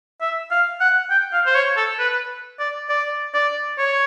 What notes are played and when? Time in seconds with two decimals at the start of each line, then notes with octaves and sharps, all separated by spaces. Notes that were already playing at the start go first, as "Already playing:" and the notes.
0.21 E5
0.51 F5
0.81 F#5
1.11 G5
1.33 F5
1.47 C5
1.55 C#5
1.77 A4
1.99 B4
2.60 D5
2.89 D5
3.34 D5
3.79 C#5